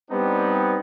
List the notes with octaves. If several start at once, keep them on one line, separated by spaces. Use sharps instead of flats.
G3 B3 C4 D4 D#4